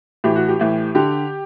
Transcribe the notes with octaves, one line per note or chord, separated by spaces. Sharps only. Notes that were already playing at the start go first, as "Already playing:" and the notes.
A2 E3 G4
F#4
G4
A2 E3
D3 G4